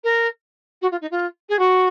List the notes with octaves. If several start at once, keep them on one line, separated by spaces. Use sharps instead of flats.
A#4
F#4
F4
D#4
F4
G#4
F#4